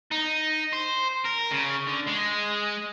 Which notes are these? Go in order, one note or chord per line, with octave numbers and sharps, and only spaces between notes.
D#4
C5
A#4
C#3
D3
G#3